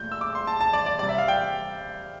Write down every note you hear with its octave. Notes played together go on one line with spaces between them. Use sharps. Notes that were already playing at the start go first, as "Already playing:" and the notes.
Already playing: A#2 A3 G6
E6
D6
C6
A5
A5
D5
D5
C3 G3 D5
E5
F5
G5